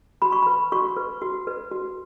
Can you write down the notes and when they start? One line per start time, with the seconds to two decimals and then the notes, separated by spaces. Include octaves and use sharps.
0.22 F#4 B5
0.32 C#6
0.43 B4 B5
0.72 F#4 C#6
0.97 B4
1.22 F#4
1.47 B4
1.72 F#4